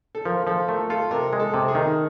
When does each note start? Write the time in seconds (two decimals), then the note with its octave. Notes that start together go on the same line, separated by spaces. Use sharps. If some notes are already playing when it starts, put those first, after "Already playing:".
0.15 A4
0.25 F3 A#4
0.47 F3 A4
0.68 A3 A#4
0.90 F4 A4
1.11 C3 A#4
1.33 G#3
1.40 A4
1.54 C3
1.68 G#4
1.75 D#3